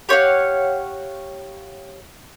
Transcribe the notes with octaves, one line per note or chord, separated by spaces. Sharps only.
G4 C#5 F5 F#5